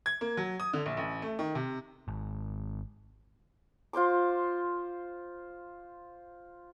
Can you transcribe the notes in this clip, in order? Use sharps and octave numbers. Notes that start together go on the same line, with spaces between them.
G#6
A#3
F#3
D#6
D3
A#1
A1
A3
D#3
C3
G#1
F4 C5 C6 D6